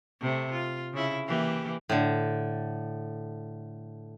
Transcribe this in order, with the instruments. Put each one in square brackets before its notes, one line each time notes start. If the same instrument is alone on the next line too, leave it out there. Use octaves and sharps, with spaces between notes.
[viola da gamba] C3 A3
F4
C#3 E4
E3 A#3 G4
[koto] A2 D3